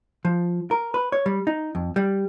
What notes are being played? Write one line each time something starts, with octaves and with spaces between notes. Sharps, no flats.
F3
A#4
B4
C#5
G3
D#4
F2
G3